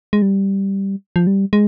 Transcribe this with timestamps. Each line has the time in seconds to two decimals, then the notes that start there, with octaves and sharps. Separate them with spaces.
0.13 G#3
0.22 G3
1.16 F3
1.27 G3
1.53 G#3